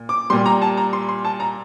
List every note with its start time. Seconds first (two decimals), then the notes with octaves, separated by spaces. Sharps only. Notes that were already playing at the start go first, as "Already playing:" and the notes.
Already playing: A#2
0.09 D6
0.30 A#2 G3 C6
0.46 A#5
0.62 A5
0.77 A#5
0.93 C6
1.09 C6
1.25 A5
1.40 A#5